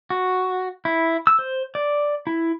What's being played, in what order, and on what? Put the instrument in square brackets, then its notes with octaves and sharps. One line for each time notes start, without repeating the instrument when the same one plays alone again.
[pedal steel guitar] F#4
E4
E6
C5
D5
E4